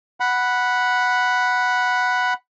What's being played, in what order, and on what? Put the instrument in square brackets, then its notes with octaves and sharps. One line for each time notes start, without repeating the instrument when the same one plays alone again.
[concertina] F#5 B5